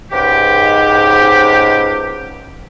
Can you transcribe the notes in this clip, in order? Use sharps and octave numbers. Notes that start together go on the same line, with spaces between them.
C#2 G#2 G4